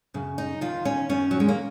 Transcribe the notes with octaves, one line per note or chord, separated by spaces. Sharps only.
F#2 C#3
D#4
D#2 D#3 F4
C#4
F#2 D#3 C#4
F#3
G#3
A#3